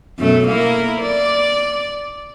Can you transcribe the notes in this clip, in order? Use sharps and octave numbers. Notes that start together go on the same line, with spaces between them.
F#2 B2 A3
A#3 E4 A#4
D5